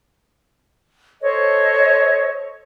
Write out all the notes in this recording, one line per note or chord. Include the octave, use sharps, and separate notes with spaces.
A4 C5 C#5 D#5